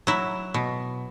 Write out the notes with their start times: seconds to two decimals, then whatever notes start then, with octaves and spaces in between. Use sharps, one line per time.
0.07 F#3 E4
0.54 B2